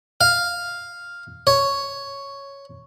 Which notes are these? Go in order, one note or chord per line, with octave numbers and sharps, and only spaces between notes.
F5
C#5